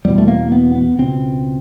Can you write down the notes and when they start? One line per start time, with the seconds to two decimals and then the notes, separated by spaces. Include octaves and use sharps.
0.05 E2 B2 G3
0.18 A3
0.28 A#3
0.52 B3
0.75 B3
0.98 C#2 B2 C4